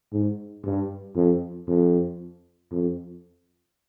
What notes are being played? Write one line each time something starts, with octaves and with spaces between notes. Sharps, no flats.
G#2
G2
F2
F2
F2